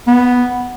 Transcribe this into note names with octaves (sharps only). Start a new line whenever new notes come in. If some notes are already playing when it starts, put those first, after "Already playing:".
B3